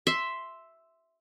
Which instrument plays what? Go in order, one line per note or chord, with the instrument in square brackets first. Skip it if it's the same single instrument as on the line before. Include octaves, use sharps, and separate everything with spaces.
[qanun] E5 C6